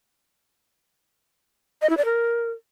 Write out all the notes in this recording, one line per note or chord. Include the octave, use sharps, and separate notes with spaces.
D#5
E4
D5
A#4